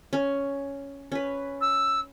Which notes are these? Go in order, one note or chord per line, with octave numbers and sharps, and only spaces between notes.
C#4
C#4 B4
E6